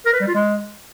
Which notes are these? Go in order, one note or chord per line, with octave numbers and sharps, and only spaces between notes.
A#4
B4
G3
F4
G#3